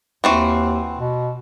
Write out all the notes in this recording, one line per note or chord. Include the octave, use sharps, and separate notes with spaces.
D#2 E3 C4 F#4
B2